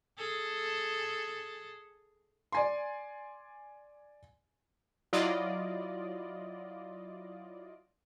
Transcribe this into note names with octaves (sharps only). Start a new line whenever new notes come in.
G#4 A4
D5 G#5 C6
F#3 E4 F4 D5 D#5